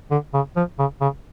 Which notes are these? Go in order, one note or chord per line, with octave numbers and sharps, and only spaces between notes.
D3
C#3
F3
C#3
C#3